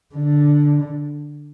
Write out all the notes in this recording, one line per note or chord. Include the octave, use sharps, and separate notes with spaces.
D3